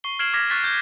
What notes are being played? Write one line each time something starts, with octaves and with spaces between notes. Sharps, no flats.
C#6 C7 G7
F6 G#6 C7 D7 E7 F#7
D6 F6 G#6 A#6 B6
C#6 F6 F#6 A6 B6
G6